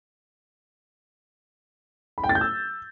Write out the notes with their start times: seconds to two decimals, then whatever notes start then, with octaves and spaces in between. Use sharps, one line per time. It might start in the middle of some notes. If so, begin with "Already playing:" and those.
2.18 B5
2.24 G5
2.29 A6
2.35 G6
2.41 E6